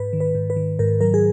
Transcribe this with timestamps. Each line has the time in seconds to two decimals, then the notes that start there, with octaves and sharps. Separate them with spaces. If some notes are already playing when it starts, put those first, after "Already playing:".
Already playing: G#2 B4
0.13 D#3
0.20 B4
0.35 G#2
0.50 B4
0.56 D#3
0.79 G#2 A#4
1.01 F#3 A#4
1.14 G#4